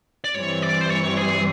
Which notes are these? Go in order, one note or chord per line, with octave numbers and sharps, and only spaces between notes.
D5
G2 E3 G3 C4 C#5
D5
C5
C#5
G#4